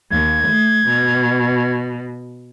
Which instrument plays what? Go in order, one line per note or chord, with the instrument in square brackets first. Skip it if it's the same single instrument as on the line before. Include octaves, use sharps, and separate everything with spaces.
[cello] D#2 [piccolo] G#6
[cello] A3
B2